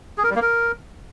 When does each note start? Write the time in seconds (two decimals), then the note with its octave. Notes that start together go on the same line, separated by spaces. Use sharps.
0.18 G#4
0.24 A#4
0.30 G3
0.36 A#3
0.42 A#4